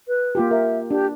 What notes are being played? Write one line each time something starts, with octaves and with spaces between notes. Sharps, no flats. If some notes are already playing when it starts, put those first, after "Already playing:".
B4
A#3 F4 G4
A#4 E5
D4 G4